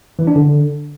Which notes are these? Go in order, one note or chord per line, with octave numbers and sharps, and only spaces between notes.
E3
D4
D3